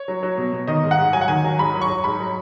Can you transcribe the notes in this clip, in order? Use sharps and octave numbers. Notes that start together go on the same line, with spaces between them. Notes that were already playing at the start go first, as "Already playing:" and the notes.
Already playing: C#5
F#3
F#3
B2
B2
D#3 D#5
G#2
F#5
G#2
F#3 G#5
F#5
D#3 G#5
F#3
G#2 B5
F#3
C#6
F#3
G#2 B5
F#3